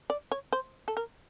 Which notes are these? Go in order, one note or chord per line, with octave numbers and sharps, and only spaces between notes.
D5
C#5
C5
A4
A#4